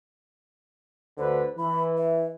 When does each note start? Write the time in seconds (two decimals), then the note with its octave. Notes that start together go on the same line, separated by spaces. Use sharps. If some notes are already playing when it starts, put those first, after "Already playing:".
1.18 D2 D3 B4 C5
1.58 E3 B5
1.97 E5